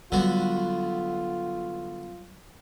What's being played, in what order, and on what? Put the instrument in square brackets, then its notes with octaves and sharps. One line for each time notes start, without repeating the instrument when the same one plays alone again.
[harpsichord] D3 B3 F#4 [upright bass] F#3 G3 [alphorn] F4